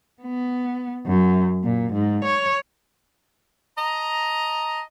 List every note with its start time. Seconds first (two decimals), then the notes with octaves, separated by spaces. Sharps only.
0.23 B3
1.07 F#2
1.64 A#2
1.93 G#2
2.25 C#5
3.78 D#5 A5 A#5